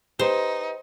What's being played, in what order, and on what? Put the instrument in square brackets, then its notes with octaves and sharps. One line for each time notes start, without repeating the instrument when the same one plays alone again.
[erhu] D#4 [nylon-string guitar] G4 B4 [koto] C5